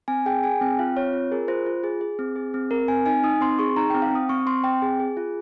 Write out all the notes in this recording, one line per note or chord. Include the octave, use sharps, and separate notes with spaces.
C4 G#5
G#4 G5
G#4 G#5
C4 G5
F4 F5
C4 C#5
F4
G#4 A#4
F4 C5
F4
G#4
G#4
C4
G#4
C4
C4 A#4
C4 G#5
D#4 G#5
D#4 D#6
C4 C6
G#4 C#6
D#4 A#5
G5
C4
F5
C4 D#6
C4 C#6
C4 C6
C4 G5
G#4
G#4
F4